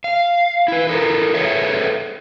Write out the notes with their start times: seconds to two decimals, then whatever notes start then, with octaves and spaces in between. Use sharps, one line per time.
0.04 F5
0.68 E4 B4
0.87 E4 A4 A#4
1.34 G#4 A4 B4 C#5 E5